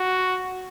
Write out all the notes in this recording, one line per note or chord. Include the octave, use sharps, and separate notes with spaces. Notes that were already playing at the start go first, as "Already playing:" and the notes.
Already playing: F#4